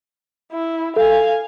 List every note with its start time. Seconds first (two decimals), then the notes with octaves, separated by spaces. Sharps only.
0.52 E4
0.96 A4 F5 G#5